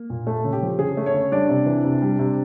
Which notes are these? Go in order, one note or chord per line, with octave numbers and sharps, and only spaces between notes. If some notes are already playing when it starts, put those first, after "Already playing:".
Already playing: A#3
A#2
A3 A4
C#3
G4
F3
C#3 G#4
A3
C#4 C#5
C#3
G3 D4 D5
C3
E3
C3
G3
C3